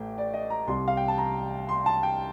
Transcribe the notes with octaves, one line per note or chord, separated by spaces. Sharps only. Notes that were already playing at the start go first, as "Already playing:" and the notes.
Already playing: A1 A3 G5
D5
D#5
A#5
C2 C3 G3 C6
F5
G5
A5
A#5
C6
A5
G5